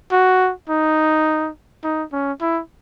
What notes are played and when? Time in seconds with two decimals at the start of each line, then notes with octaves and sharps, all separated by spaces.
0.12 F#4
0.69 D#4
1.84 D#4
2.12 C#4
2.41 E4